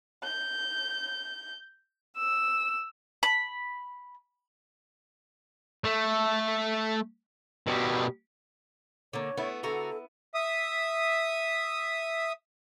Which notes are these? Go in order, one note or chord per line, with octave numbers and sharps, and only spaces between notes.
G6
E6
B5
A3
B2 G3
D3 A#3 C#5
A3 B3 E4
D3 F#4 A4 A#5
E5 D#6